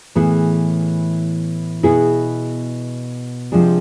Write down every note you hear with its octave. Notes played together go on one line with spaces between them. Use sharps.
A2 E3 B3 E4 G#4
B2 B3 E4 G#4
C3 F3 G#3 D4 G#4